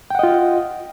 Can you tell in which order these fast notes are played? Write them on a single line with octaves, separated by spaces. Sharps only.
G5 F#5 D#5 F4